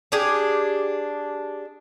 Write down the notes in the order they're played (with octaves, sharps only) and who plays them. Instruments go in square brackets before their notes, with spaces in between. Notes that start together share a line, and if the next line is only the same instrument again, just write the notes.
[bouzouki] D4 G4 G#4